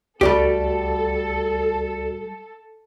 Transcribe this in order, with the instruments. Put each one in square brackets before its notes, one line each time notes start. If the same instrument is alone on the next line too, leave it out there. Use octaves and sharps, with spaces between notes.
[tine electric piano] C#2 F#4 D5 [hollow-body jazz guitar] G3 A3 G4 [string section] A4